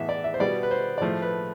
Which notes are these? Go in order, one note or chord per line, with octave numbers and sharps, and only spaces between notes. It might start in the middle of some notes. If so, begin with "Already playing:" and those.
Already playing: A2 E3 B3 E5
D5
E5
C5
B2 G3 B3 D5
B4
C5
D5
A2 F3 A3 C5
B4